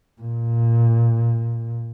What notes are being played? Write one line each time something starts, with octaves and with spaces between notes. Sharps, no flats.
A#2